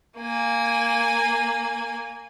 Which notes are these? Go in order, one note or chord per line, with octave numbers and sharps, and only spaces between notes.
A#3 G#5